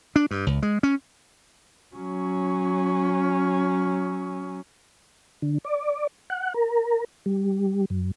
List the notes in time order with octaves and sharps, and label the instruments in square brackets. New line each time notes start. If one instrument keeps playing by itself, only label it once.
[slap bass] D4
G2
C#2
G#3
C#4
[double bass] F#3 C#4
[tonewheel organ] D3
D5
F#5
A#4
G3
F#2